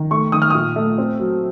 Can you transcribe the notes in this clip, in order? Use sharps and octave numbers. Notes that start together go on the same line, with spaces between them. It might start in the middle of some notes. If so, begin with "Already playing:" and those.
Already playing: D#3
A3 C#6
D#3 D#6
F6
A#2 D#6
A3
C4
F#3